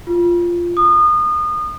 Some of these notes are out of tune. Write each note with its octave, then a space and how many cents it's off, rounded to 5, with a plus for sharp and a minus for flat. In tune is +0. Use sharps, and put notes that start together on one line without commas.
F4 -10
D#6 -30